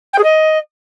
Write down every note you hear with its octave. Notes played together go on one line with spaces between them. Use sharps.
G5
G#4
D#5